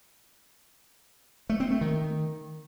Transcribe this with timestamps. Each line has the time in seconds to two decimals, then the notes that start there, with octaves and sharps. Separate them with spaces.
1.49 A3
1.60 C4
1.71 A3
1.81 D#3